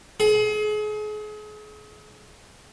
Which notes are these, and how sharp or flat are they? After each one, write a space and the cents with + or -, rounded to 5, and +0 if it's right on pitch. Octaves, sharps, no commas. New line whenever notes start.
G#4 +35